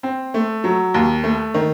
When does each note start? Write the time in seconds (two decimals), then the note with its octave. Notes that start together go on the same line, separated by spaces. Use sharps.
0.03 C4
0.34 A3
0.64 F#3
0.94 D#2
1.24 A3
1.54 D#3